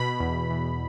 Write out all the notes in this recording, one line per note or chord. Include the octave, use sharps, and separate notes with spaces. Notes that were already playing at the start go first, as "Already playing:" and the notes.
Already playing: B2 B5
E2
E2